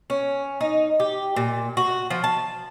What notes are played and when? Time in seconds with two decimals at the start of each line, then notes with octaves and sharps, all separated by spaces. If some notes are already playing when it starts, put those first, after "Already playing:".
0.10 C#4
0.61 D#4
1.00 G4
1.36 A#2
1.77 F#4
2.10 F3
2.24 A5